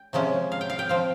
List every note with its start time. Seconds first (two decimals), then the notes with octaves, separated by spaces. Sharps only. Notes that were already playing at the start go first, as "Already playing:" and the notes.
Already playing: G5
0.13 C3 F3 G#3 C#4
0.52 F5
0.61 G5
0.70 F5
0.79 G5
0.89 F3 C4 F5